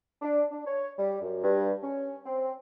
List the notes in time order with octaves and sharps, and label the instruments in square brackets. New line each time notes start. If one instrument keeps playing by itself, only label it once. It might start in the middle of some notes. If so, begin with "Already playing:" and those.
[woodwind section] D4
D4
C#5
G3
F#2
G2
C#4
C4